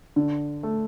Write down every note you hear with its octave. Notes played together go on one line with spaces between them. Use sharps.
D3
A3